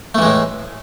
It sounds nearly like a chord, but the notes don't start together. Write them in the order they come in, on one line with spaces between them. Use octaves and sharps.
A3 E3 G#3 A2